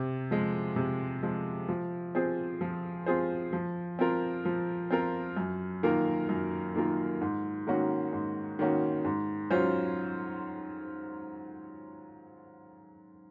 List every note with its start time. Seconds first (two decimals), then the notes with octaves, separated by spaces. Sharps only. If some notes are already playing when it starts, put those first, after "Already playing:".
Already playing: C3
0.31 F3 G#3
0.76 C3
1.23 F3 G#3
1.69 F3
2.15 C4 F4 G#4 C5
2.61 F3
3.06 C4 F4 G#4 C5
3.53 F3
3.99 C4 F4 A#4
4.45 F3
4.91 C4 F4 A#4
5.37 F#2
5.83 D#3 A#3 F4 A#4
6.29 F#2
6.75 D#3 A#3 F4 A#4
7.21 G#2
7.67 D#3 A#3 C#4 F#4
8.13 G#2
8.59 D#3 A#3 C#4 F#4
9.05 G#2
9.51 F#3 C#4 F4 C5